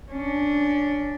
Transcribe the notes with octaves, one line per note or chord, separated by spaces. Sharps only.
C#4 D4